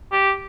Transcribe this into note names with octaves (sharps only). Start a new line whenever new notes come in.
G4